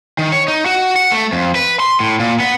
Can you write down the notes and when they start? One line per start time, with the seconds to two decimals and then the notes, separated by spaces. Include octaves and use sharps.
0.19 D#3
0.32 C#5
0.48 D#4
0.66 F#4
0.96 F#5
1.12 A3
1.33 F2
1.55 B4
1.80 C6
2.00 A2
2.20 A#2
2.40 B3